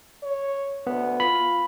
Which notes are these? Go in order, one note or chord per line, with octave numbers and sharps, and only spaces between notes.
C#5
D2 B3
F4 B5